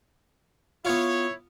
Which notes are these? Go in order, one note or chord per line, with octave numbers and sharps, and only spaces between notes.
B3 E4 F4 C#5